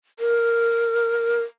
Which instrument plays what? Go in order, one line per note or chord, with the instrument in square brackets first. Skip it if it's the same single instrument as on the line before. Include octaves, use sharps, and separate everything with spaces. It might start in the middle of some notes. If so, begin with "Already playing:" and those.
[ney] A#4